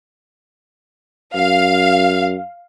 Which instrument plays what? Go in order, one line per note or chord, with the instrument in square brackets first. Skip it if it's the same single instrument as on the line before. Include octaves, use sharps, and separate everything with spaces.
[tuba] F#2 [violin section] F5